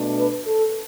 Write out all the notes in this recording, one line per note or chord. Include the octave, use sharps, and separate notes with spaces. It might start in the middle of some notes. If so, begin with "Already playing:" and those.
Already playing: B2 A3 D4
B4
A4